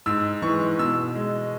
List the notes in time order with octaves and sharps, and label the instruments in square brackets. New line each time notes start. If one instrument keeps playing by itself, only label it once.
[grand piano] G#2 E6
E3 G#3 C#6
B2 E6
G#3